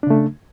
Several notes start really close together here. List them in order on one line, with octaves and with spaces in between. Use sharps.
D4 C#3 A3